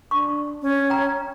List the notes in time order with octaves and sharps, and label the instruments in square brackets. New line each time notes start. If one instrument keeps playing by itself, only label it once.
[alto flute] D4 [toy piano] C#6
[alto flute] C#4
[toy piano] G5 A#5